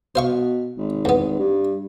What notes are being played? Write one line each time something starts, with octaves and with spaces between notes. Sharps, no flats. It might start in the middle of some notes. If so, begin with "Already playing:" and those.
B2 C5 F5 C#6
G#1
E2 B3
G2